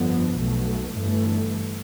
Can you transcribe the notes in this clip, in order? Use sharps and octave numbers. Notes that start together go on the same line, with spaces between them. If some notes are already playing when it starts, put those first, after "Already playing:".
Already playing: G1 F2 D3 F3 B3
B1 B2 A3
G1 G2 E3 A3